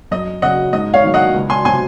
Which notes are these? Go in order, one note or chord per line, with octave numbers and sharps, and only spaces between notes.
F#2 D#5
C#3 F#3 D#5 F#5
G#2 D#5
C#5 F5
D#3 F#3
D#5 F#5
C#2
G#5 C6
C3 F#3 G#5 C6